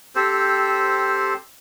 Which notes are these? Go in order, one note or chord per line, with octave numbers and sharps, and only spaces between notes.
C4 G4 A4 C5